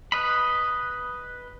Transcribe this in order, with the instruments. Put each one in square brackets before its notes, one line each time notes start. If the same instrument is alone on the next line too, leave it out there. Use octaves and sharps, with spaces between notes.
[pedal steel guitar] B4 D#5 B5